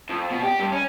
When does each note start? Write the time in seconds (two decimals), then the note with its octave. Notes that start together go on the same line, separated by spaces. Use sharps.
0.09 F2
0.31 B2
0.43 G4
0.59 G2
0.72 C#4